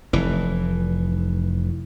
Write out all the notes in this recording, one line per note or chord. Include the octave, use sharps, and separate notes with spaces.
F1 E3